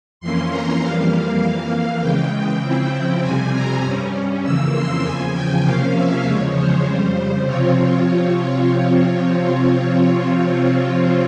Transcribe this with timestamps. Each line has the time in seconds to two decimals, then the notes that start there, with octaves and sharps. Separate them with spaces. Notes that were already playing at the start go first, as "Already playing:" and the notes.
0.20 F2 E3 A#3 C#4 C6
0.50 A#5
0.81 F2 E3 G3 A#3 F5
1.41 F2 E3 A#3
2.01 C#3 E3 G#3 G5
2.62 C#3 F3 C4 E4
3.22 F2 C3 G3 C4 G#5
3.52 A#5
3.82 G2 G3 C#4
4.43 F2 C#3 E3 A#3 E6
4.74 C6
5.03 E2 C#3 F3 G#5
5.33 G5
5.64 C3 F3 A#3 C#4 F5
5.95 E5
6.24 E2 C#3 F3 G#3 C#5
6.54 C5
6.84 F2 C#3 G3
7.45 C3 F3 C4 F4 C#5